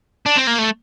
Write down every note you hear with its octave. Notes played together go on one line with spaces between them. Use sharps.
D4
C4
A#3
A3